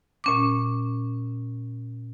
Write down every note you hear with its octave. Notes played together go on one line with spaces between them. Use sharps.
A#2 C#4 D6